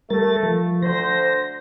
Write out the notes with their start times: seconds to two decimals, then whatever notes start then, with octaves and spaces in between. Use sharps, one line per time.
0.10 G3 A3 A#4 A6
0.43 F3
0.83 D2 C5 A#6